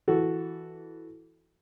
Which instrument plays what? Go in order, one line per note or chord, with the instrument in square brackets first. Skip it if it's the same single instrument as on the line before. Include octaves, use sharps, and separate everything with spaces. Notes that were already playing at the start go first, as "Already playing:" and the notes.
[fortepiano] E3 F#4 A4